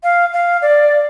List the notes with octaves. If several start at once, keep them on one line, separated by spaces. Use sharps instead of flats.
F5
F5
D5